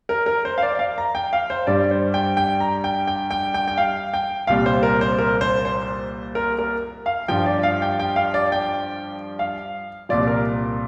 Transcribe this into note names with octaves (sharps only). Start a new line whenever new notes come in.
A#4
A#4
C5
F5
D5
F5
A#5
G5
F5
C5
G2 G3 D5
C5
G5
G5
A#5
G5
G5
G5
G5
G5
F5
G5
C2 A#2 G3 F5
C5
A#4
C5
A#4
C5
C5
A#4
A#4
F5
G2 F3 G5
D5
F5
G5
G5
F5
D5
G5
F5
C2 A#2 F3 D5
A#4